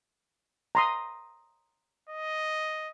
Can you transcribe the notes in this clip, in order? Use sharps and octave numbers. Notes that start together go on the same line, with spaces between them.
A#5 C6 D#6
D#5